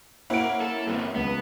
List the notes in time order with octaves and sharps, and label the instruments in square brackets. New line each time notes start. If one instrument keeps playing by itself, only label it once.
[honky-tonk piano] A#3 C#4 E4 [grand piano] F#5 D7
[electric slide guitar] A4
G2 B3 C4
[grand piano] C#2 [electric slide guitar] B3